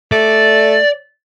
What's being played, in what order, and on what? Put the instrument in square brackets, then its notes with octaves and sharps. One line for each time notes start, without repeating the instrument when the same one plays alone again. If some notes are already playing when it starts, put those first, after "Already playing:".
[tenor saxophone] A3 [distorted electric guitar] D5